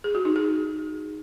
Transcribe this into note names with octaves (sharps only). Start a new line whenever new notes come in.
G#4
F#4
D#4
G#4